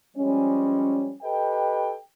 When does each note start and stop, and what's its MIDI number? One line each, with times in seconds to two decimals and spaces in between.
0.17 1.14 53
0.17 1.14 55
0.17 1.14 56
0.17 1.14 61
1.23 1.95 67
1.23 1.95 69
1.23 1.95 71
1.23 1.95 75
1.23 1.95 79